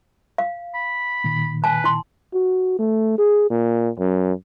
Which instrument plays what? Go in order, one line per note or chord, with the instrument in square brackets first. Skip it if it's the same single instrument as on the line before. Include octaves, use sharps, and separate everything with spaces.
[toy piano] F5
[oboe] B5
[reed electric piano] A#2 D#3
[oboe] B4 [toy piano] G#5 A5
[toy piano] E4 C6
[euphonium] F#4
A3
G#4
A#2
F#2